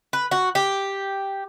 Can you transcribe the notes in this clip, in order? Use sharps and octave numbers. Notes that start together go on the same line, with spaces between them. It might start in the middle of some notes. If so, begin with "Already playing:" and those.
B4
F#4
G4